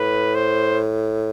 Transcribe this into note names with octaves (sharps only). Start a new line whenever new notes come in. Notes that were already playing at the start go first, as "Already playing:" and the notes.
Already playing: A2 B4
C5